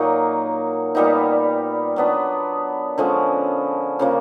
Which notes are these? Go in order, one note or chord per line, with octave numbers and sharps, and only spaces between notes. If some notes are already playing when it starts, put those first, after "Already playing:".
Already playing: A#2 F#3 A#3 D#4
A#2 G3 B3 D#4
F#3 B3 D4
D3 F3 G#3 C#4
C#3 F3 A#3